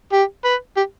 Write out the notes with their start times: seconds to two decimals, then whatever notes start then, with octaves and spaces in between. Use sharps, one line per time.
0.13 G4
0.44 B4
0.77 G4